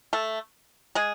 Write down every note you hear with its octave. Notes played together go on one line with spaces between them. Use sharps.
A3 A4
G#3 G#4